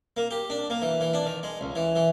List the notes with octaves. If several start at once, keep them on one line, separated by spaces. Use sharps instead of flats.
A#3
G4
D4
A#3
E3
E3
D4
D#3
G#3
C#2
E3
E3